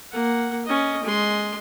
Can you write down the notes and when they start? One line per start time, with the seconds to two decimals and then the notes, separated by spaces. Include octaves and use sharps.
0.12 A#3 F#5
0.66 C#4 D#5
1.04 G#3 C6